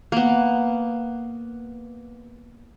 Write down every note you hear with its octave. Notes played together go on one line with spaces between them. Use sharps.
A#3 B3